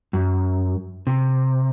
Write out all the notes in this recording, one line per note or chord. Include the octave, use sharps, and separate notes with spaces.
F#2
C3